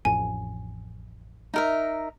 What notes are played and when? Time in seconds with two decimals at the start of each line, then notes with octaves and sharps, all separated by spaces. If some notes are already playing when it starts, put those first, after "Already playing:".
0.05 A1 F2 A2 G#5
1.54 D#4 A#4 E5